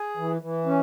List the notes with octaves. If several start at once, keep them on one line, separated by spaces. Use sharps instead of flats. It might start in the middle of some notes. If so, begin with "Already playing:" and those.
Already playing: G#4
E3
E3
C#4